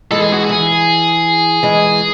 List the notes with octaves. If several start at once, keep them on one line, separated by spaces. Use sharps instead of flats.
E3 G#3 A4
G#4
F#4
E3 G#4
E3 G#3